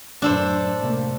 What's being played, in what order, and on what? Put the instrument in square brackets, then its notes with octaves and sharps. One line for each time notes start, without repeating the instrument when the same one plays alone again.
[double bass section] F#2 A2 [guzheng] D4 A4 C5
[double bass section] C3 A3 A#3